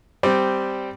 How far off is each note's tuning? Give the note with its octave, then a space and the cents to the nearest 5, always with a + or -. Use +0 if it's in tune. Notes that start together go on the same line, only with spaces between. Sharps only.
G3 +0 C4 -10 D5 +0